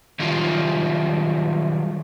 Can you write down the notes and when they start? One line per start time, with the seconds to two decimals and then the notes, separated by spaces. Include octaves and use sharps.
0.19 D#3 F#3 G3 F4